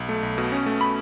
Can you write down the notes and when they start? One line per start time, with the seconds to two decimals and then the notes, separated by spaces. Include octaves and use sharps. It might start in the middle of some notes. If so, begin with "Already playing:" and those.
Already playing: B1
0.09 A3
0.23 B1
0.38 B2
0.52 C#4
0.66 A3
0.81 B5